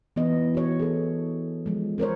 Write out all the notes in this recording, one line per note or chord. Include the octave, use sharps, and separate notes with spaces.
E3 B3 D#5
F#4 C#5
G#4 A4
F3 G#3
C4 A#4 C5 C#5